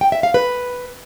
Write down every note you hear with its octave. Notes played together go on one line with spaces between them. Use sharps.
G5
E5
F5
B4